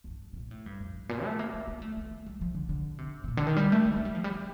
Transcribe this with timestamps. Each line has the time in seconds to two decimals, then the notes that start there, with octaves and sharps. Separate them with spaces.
0.04 F2
0.07 G2
0.33 C3
0.37 A#2
0.51 A2
0.66 G2
0.80 F2
0.94 G2
1.09 A#2
1.24 A3
1.39 A#3
1.53 A3
1.68 A#3
1.82 A3
1.97 A3
2.11 A3
2.26 G3
2.41 F3
2.54 D3
2.69 D3
2.98 C3
3.24 C3
3.28 A#2
3.37 D3
3.47 D#3
3.56 G3
3.72 A3
3.85 A3
3.96 A3
4.05 G3
4.15 F3
4.24 G3
4.35 A3